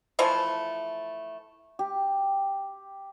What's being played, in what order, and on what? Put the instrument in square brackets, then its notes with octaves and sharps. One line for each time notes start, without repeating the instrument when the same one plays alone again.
[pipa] E3 F3 A3
[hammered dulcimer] G4